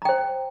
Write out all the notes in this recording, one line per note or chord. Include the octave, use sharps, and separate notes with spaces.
C5 G5 A#5